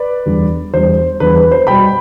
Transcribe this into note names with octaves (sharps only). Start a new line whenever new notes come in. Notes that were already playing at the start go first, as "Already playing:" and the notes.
Already playing: B4 D5
E2 D3 G3
E2 D3 G3 C5
E2 D3 G3 B4
B4
C5
B2 G3 G5 B5